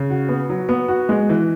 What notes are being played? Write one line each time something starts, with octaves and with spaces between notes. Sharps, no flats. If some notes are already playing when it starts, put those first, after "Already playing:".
Already playing: C#3
F#4
B3
F#3
B3
F#4
G#3
E3